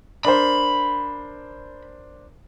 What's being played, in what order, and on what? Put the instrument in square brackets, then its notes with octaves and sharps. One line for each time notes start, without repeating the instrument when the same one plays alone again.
[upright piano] D4 A#4 C5 [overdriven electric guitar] B5